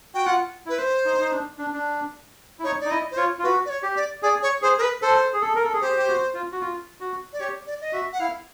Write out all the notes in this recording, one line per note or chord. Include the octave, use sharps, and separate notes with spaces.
F#4 G5
F4 F#5
E4 B4
C5
D#4
D#4
D4
D4
D4
E4
D#4 C#5
D#4 D5
E4 D#5
C5
F4 C#5
F4
F#4 B4
D5
C#5
G4
D5
G#4 D5
C#5
G#4 C5
A#4
B4
A4 C5
G#4
A4
A#4
A4
G#4
G4 C5
G4
F#4
F4
F#4
F4
F#4
D5
G4 C#5
D5
D#5
F#4 E5
F#5
E4 F5